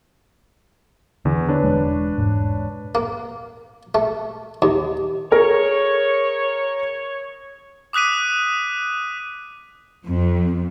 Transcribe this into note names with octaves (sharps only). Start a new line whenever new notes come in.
E2 D3
D4 B4 C#5
E1 G#3
E1 G#2
A#3
A3
D#2
G#4 A#4 C#5
D6 D#6 F#6 B6 D#7
F2